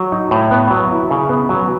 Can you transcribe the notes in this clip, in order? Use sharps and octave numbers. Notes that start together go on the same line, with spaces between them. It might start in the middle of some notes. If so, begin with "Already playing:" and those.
Already playing: F#3
D#4
A2
B3
F#3
E4
C#3
B3
F#3